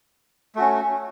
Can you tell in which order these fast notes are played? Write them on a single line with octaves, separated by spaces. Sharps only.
A3 F#4 C#4